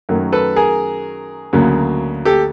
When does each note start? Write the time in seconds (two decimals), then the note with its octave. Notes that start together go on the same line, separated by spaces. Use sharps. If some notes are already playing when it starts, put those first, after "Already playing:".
0.09 F#2 D#3 F#3 A3
0.32 A4 B4
0.56 G#4 A#4
1.53 D2 C#3 F#3 A#3
2.25 G4 A4